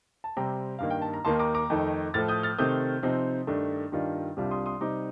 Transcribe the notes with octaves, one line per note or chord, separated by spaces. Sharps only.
A5
C3 G3 C4 G5 A#5
G2 D#3 A#3 F5
G5
A5
A#5
D#2 D#3 A#3 D#4 A5 C6
A#5 D6
A#5 D6
F2 D#3 A3 D#4
A2 F3 A3 F6 A6
D#6 G6
F6 A6
C3 D#3 A3 C4 D#6 G6
C3 F3 C4 D#4
G2 D#3 A3 D4
G2 D#3 G3 D4 F4
C2 C3 G3 D4 F4
C6 D#6
C6 D#6
C3 G3 C4 D#4 A#5 D6